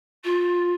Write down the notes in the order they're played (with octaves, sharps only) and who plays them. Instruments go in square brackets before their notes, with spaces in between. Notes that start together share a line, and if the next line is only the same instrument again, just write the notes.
[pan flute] F4